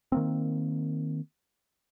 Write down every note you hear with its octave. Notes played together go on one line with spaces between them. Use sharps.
D#3 A#3 C4